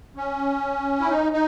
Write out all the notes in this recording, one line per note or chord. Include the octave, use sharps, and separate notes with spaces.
C#4
E4
D#4
D#4